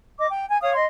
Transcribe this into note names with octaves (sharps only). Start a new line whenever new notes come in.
D#5 D6
G5
G#5
C#5 F5 D#6
D#5 C6